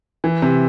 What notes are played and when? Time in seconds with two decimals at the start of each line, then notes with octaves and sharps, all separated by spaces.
0.24 E3
0.42 C3